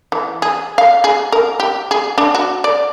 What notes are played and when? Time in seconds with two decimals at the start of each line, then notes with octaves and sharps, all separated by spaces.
0.12 E3
0.42 G#4
0.78 F5
1.04 G#4
1.32 A#4
1.60 G4
1.91 G#4
2.18 D4
2.35 F#4
2.64 D5